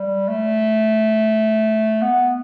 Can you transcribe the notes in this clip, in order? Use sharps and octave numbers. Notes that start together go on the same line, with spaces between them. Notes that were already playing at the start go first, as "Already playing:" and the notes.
Already playing: G3
A3
B3